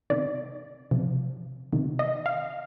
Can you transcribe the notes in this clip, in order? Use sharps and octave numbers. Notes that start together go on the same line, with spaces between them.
C3 D#3 D5
C3 F3
C3 D#3
D#5
F5